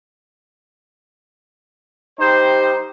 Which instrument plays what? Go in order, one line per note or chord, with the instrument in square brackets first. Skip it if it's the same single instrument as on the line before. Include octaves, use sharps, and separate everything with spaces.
[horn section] G3 D#4 G4 C5